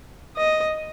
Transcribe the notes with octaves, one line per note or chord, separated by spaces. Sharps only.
D#5